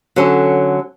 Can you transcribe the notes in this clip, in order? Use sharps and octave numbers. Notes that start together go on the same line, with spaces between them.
D3 F#3 C#4 A4